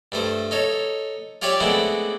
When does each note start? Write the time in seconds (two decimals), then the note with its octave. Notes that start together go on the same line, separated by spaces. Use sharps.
0.12 G2 A3 C5
0.51 D#4 A4 C#5
1.42 F4 G4 C#5 D5 E5 F5
1.60 G#3 A3 B3 C4 D4 E4